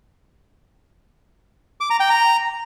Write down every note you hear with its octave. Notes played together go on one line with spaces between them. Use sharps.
D6
A#5
G5
A#5